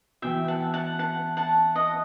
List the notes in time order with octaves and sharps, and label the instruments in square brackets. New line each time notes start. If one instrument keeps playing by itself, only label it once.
[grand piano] E3 B3 F#4 [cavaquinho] E5 G5
[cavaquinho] F#5 A5
F#5 A5
F#5 A5
F#5 A5
D#5 F#5